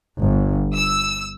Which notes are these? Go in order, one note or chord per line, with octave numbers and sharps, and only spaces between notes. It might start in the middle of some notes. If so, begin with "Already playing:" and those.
G1
E6